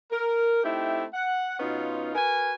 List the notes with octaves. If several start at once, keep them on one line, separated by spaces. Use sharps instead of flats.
A#4
A3 C4 D#4 E4 G4 G5
F#5
B2 B3 C#4 D#4 F4
F#4 A#4 B4 G#5